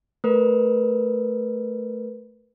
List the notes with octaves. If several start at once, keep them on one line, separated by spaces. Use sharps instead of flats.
A3 A#4 B4